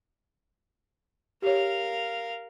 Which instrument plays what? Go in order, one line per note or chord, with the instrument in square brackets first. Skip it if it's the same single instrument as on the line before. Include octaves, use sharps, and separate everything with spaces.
[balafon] G4 C#5 [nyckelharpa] A#4 F5